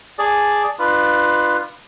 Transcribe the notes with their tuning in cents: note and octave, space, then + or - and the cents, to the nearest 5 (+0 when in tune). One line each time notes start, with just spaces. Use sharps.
G#4 +0 D5 +0 A5 +0
D4 +40 F4 +0 B4 +0